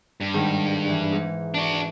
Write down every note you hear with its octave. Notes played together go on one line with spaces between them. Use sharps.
G2
G#2 D#3
E3
G#2
D4 F#4